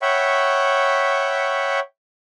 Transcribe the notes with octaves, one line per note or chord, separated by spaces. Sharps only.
C#5 E5 F#5 G5 B5 C#6